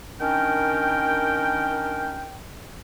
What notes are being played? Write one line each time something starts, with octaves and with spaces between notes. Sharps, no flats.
D#3 C#4 D4 A#4 G5